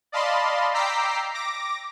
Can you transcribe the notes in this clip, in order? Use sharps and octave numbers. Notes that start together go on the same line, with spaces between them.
D5 D#5 F5 A5 B5 C6
G5 A#5 D6 E6 B6 C7
D6 A#6